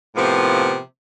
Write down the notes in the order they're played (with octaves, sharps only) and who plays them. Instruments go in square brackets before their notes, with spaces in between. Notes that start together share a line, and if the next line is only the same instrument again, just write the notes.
[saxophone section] A2 C3 F3 A#3 B3